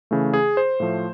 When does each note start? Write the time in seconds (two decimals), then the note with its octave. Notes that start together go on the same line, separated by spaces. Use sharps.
0.11 C#3 E3 A3
0.34 G#4
0.57 C5
0.80 A2 F3 A3